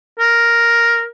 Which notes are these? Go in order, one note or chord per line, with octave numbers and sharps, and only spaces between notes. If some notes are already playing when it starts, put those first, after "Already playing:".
A#4